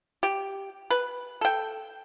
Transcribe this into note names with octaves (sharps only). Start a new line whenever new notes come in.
G4
B4
A4 G5